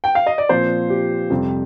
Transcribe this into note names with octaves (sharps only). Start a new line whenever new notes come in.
G5
F5
D#5
D5
A#2 F3 C4 C5
G4
F2 C3 G3